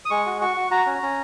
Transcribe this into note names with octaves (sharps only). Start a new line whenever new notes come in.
D#6
G#3 C#6
F#4
F#4 C#6
F#4
F#4 A#5
C#4
C#4